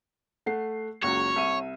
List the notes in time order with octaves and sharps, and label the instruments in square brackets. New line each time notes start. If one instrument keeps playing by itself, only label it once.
[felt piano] A3 F#5 C7
[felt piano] F#1 C#2 F#4 [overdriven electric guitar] C#5
[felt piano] C2 E5 D#7